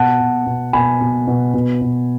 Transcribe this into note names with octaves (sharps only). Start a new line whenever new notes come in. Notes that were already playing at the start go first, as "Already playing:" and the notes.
Already playing: B2 F#5 A5
B2
B2
B2 G#5 B5
B2
B2
B2
B2